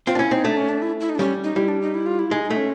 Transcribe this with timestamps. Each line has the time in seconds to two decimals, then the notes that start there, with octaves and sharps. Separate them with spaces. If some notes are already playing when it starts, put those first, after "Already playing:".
0.07 C4 F4
0.15 D4
0.19 C#4 E4
0.31 C4 D#4
0.44 A3 D4
0.57 C#4
0.69 D4
0.82 E4
1.00 E4
1.09 D#4
1.15 D4
1.19 G3 C#4
1.44 D#4
1.56 G3 E4
1.68 D4
1.82 D#4
1.94 E4
2.06 F4
2.19 E4
2.31 G#3 D#4
2.44 D#4
2.50 A3
2.57 C#4